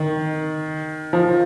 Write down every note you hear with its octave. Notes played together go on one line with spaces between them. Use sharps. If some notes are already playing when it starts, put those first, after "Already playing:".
Already playing: D#3
F3